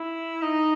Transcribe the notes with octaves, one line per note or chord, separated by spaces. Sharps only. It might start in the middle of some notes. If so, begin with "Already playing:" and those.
Already playing: E4
D#4